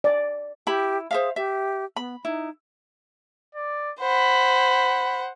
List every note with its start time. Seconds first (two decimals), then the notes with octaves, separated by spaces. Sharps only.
0.04 D5
0.67 E4 G4 B5
1.11 G#4 C5 E5 F5
1.36 G4 E5
1.96 B3 B5
2.25 D#4 E4
3.55 D5
4.00 C5 F#5 B5